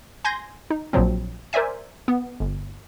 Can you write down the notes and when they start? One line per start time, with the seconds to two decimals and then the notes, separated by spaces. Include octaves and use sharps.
0.25 G#5 C6 G6 G#6 A#6
0.70 D#4
0.93 A#1 A#2 F3 F#3 C4
1.53 A#4 C5 D5 E5 G#5
2.08 B3
2.40 G1